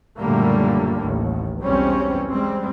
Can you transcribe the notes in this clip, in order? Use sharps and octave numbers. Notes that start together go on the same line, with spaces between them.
F#1 A#2 D3 G3 A3 A#3
A1 D#2
B1 E2 G3 C4 C#4
G3 G#3 C4